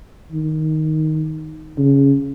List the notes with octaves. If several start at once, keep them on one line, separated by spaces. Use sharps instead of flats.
D#3
C#3